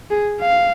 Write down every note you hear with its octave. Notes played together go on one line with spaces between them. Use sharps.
G#4
F5